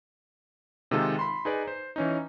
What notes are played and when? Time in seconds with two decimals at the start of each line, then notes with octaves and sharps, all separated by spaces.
0.91 C3 D#3 G#3 D#4 F4 A4
1.19 B5 C6
1.45 D#4 G#4 B4 D5
1.68 C5
1.96 E3 C#4 D#4